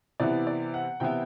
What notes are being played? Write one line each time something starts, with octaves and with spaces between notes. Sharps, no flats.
C3 E3 B3 E4 D5
D5
F#5
C3 E3 B3 E4 G5